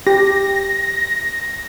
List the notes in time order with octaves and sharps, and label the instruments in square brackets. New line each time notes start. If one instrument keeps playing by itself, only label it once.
[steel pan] G4 [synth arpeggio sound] A#6